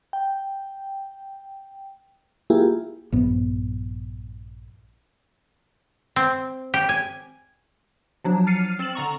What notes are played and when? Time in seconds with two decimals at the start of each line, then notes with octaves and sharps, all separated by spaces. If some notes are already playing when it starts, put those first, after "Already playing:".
0.13 G5
2.50 A#3 E4 F4 G4 G#4
3.12 A#1 G2 B3
6.16 C4
6.74 G4
6.89 G#5
8.24 F3 F#3 D4
8.47 F6 A6 C7 C#7 D#7
8.79 C4 A6 E7 F#7
8.95 D3 A#5 C#6